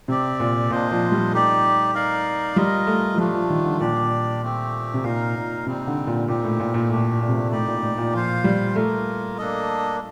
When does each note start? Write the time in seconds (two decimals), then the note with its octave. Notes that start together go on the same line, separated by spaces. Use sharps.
0.08 C3 C4 G4 D5
0.40 A#2
0.70 A#2 D4 F4 C5 D#5
0.91 F3
1.12 G3
1.33 A3 D#4 G4 D5
1.94 D#4 A#4 D5 F5
2.56 G3 F4 A#4 D#5
2.87 A3
3.14 F3
3.18 G3 A3 D4 F4
3.34 F3
3.50 D#3
3.65 D3
3.80 A#2 D4 G4 D5
4.42 A3 C4 G4
4.94 C3
5.04 A#2 D#4 A#4 F5
5.35 A#2
5.66 C3 G3 C4 D#4
5.87 D3
6.07 A#2
6.27 A#2 C4 D#4 G4
6.44 A2
6.60 A#2
6.74 A#2
6.90 A2 A3 D4 G4
7.21 A#2
7.29 C3
7.36 A#2
7.51 A2 D#4 G4 D5
7.67 A#2
7.83 A2
7.98 A#2
8.13 F3 F4 C5 F5
8.44 G3
8.75 A3 A#3 F4 A#4
9.38 A#3 D4 A4 D#5